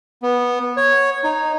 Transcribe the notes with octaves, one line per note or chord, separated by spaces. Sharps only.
B3
C#5
D#4